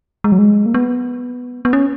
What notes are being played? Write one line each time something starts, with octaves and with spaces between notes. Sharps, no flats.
G#3
F#3
G#3
A#3
B3
B3
C#4